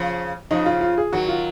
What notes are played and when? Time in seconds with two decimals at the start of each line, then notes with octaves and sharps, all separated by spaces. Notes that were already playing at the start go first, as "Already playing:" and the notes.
Already playing: C#3 F3
0.51 C#3 F3 D#4
0.66 F4
0.81 F4
0.98 G#4
1.12 D#3 F#3 F#4
1.28 F4